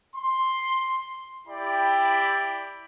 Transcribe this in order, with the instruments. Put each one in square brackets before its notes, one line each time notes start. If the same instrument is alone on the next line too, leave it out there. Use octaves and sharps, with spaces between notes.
[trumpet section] C6
E4 G4 D5 G5 B5